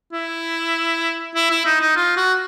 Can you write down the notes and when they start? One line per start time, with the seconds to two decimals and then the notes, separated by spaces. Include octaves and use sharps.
0.12 E4
1.35 E4
1.50 E4
1.65 D#4
1.81 D#4
1.96 F4
2.16 F#4